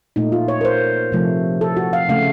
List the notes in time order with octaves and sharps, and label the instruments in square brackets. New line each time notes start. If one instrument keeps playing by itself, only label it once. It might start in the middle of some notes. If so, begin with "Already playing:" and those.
[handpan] A#2 A3 D#4
F4
C#5
A#4
C5
C3 F3 A3
A4
F#4
F5
C#3 A3 F5